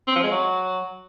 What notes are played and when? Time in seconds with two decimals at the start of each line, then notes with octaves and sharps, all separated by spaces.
0.07 C4
0.15 F3
0.23 G#3
0.31 F#3